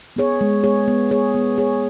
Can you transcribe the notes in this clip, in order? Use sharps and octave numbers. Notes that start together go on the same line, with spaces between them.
B3 G#4 C#5
G#3
B3 G#4 C#5
B3
G#4 C#5
B3
G#4 C#5